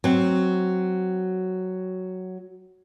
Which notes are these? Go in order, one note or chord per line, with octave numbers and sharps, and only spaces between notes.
F#3 C4